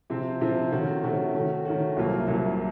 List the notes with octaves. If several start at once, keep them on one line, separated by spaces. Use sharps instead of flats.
C3 F3 C4
C3 F3 C4
C3 D#3 A3 C#4 F#4
C3 D#3 A3 C#4 F#4
D#3 A3 C#4 F#4
D#3 A3 C#4 F#4
C2 C3 F#3 A#3 F4
C2 C3 F#3 A#3 F4